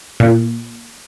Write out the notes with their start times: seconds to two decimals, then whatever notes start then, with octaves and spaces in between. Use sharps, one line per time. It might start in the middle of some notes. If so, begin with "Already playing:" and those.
0.20 A#2